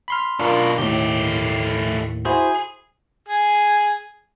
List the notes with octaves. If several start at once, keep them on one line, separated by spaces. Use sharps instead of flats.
B5 C6 F6
F#2 B2 D4 F4 A#4
D#2 A2 A3 G4
E4 F#4 G#4 C5
G#4